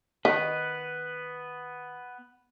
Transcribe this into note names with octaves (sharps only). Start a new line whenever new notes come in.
D#3 B3 B4